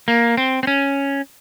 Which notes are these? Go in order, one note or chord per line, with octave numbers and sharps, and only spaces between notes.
A#3
C4
C4
C#4